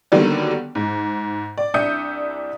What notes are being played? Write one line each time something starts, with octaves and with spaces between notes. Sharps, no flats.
D3 D#3 F#3 G3 A#3 B3
G#2
D5
C2 D4 E5 D#6 G6 C#7